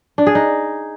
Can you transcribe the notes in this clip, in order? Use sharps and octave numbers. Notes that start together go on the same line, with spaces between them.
D4
G#4
D#4